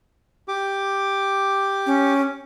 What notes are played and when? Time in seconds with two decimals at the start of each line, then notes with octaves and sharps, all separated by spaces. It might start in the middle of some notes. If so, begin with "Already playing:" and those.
0.48 G4 D6
1.86 C#4